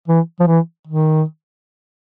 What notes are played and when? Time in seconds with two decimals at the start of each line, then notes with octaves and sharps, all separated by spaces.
0.08 E3
0.40 F3
0.47 E3
0.87 D#3